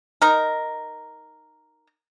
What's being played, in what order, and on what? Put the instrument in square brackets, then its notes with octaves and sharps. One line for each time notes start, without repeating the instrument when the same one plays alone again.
[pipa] D#4 A#4